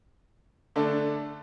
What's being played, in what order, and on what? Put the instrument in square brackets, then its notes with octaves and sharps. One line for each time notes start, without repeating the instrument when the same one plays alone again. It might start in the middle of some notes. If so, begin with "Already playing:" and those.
[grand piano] D3 A3 D4 A4